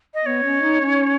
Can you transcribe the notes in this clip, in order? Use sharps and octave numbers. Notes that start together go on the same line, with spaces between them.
D#5
B3 C#5
C#4
D#4
C#4